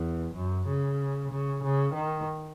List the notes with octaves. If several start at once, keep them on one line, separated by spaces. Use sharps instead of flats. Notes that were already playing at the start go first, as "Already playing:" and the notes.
Already playing: E2
F#2
C#3
C#3
C#3
D#3